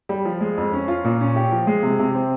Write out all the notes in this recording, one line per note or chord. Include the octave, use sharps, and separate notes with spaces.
G3
F3
G#3
F2
C#4
F4
A#2
C#4
G4
F3
G#3
C3
C3
C4